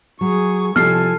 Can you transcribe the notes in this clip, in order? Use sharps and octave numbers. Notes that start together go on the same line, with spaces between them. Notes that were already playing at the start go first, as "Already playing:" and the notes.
F#3 G#4 C#6
C2 F3 A4 G#5 A5 F6 C7